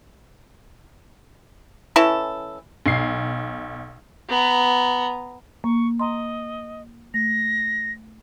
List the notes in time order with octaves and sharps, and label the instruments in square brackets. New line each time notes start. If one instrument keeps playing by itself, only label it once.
[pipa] E3 C#4 E4 A4
[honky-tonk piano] B1 C7
[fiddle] B3 A#5
[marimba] A#3 [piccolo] C#6
[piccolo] D#5 [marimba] A#5 C6
[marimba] A3 [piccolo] A#6